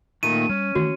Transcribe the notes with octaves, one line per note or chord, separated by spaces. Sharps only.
A#2 D#3 A3 D#7
G3 C#4
D#3 E3 A3 F#4